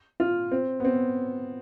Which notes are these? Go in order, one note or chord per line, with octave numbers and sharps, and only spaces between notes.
F4
C4
B3
C4